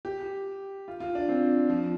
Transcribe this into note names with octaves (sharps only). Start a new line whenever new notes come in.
G4
F4
F4
D4
C4
F3